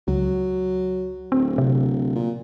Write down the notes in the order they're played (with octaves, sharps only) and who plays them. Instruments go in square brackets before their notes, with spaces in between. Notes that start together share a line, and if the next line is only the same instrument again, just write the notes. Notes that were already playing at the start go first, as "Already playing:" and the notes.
[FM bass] C#2 [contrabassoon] F#3
[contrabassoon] D1 [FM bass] C4
[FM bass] C3
[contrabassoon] A#2